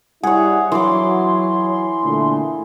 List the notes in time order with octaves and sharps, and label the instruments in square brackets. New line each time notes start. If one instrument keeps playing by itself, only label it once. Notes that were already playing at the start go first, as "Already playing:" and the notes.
[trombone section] G3 E4 [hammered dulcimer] G#4 C#5 [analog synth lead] F#5
[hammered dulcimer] E3 D6 [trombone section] F#3 [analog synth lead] C6
[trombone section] A#2 D3 A3